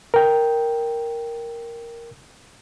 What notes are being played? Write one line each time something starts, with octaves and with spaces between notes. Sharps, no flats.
A#4 G5